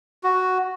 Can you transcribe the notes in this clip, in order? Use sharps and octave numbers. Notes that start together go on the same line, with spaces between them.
F#4